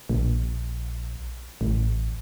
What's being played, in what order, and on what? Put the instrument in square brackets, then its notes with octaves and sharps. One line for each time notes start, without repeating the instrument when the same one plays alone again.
[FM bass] A#1
A1